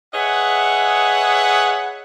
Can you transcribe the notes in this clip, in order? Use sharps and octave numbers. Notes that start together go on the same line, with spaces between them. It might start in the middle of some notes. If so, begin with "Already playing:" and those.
G#4 B4 C#5 D#5 E5 F#5